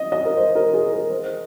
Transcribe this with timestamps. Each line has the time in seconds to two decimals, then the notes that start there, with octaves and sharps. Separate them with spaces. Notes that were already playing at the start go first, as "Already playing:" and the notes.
Already playing: D#5
0.12 D#5
0.26 A#4
0.37 C5
0.55 A#4
0.73 G#4
0.92 A#4
1.10 C5